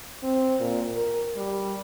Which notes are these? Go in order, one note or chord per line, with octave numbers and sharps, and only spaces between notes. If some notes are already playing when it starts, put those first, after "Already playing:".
C4
A#2
A#4
G3